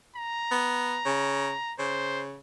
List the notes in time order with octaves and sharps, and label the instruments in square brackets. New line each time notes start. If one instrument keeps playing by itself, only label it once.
[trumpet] A#5
[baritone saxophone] B3
C#3
[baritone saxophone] C#3 [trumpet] C5